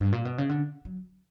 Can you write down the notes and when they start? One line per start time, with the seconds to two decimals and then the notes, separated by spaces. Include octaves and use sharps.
0.00 G2
0.12 A#2
0.25 B2
0.38 C#3
0.49 D3
0.85 F#3